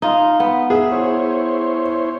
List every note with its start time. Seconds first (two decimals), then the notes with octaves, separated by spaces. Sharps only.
0.02 D#4 F4
0.40 B3
0.70 G#4 E5
0.92 E4 C5 C#5